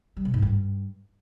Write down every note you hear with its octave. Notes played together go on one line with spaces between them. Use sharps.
G3
B2
G#2
G2